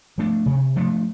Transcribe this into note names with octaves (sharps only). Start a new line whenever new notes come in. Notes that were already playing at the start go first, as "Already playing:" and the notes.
F3 A3 D4
C3
F3 A3 D4